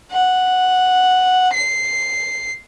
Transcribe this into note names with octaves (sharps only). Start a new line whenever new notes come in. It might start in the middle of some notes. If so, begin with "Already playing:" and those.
F#5
C7